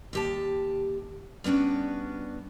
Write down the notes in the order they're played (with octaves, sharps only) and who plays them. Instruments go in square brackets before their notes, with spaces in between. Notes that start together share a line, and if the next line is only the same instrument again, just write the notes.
[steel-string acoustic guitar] D#2 G4 A5
G3 B3 C#4 D4 F#4